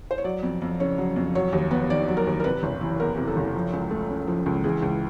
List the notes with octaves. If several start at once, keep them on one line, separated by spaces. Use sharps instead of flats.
C5
C#5
F#3 D5
F2
F2
C#3 C#5
F#3
F2
F#3 C#5
D#2
B3
D#3 D5
F#3
A#4
D#2
A#4
C3 B4
F#1
E3
E2 A#4
C3
A4
F#1
F3
C#2
A3
C#3
F3
C#2
E3 G#4
C#2